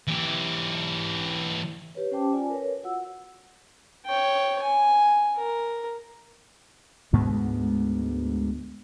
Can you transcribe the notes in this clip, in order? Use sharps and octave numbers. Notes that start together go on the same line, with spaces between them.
E3 G4
G4 B4 C#5
C#4 G4 C5 G5 A5 D6
F4 D5 G#5
A#4 B4 C#5
F4 F#4 F#5 E6
C#5 G5
G#5
A#4
D2 G#2 G#3 B3